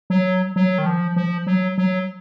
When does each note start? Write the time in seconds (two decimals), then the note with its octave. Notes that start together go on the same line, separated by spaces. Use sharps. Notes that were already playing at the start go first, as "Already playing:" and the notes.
0.10 F#3
0.56 F#3
0.78 D#3
0.86 F3
1.16 F3
1.47 F#3
1.78 F#3